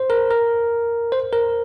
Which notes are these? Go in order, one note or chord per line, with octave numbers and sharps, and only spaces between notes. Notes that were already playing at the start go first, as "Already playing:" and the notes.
Already playing: C5
A#4
A#4
C5
A#4